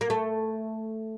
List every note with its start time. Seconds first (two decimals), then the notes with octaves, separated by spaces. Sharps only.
0.01 A#3
0.10 A3